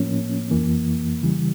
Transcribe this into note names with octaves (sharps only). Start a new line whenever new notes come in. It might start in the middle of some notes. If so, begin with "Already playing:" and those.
Already playing: A2 F3 A#3 C#4
F2 E3 A#3
C#3 E3 G3